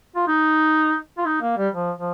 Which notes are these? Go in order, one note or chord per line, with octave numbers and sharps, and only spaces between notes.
F4
D#4
F4
D#4
A#3
G3
F3
F3